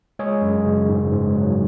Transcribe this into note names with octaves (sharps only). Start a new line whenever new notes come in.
G#3 G#4 C#5
F#2
C#3
G#2
G#2
F#3